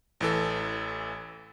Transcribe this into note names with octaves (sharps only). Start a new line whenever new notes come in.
A1 E3 A4